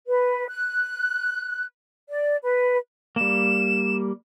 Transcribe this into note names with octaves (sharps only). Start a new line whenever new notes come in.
B4
F#6
D5
B4
G3 A#3 E7